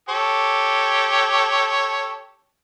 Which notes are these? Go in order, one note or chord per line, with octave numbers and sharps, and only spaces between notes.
G4 A4 C#5